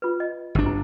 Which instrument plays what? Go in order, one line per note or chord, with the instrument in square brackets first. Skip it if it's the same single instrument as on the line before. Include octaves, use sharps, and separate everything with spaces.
[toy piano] F4 B4
D#5
[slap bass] G1 D4
[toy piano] E4